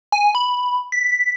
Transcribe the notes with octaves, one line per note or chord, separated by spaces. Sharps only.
G#5
B5
B6